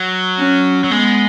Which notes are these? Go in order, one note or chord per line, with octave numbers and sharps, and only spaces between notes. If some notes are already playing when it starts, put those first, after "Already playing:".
Already playing: F#3
C#4
F#3
G#3 B3